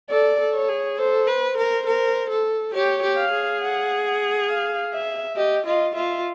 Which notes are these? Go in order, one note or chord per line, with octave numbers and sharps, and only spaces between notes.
A4 D5
A4
C#5
G#4
A4 C5
B4
C5
A#4
A#4
A4
G4 C#5
G4
F5
G#4
F#5
F#5
F5
E5
G4 D#5
F4 D#5
F4 E5